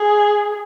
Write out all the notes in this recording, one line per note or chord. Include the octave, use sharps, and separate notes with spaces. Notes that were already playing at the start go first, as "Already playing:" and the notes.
Already playing: G#4